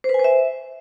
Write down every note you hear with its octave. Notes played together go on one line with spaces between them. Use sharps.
C5
B4
G#5
C5
E5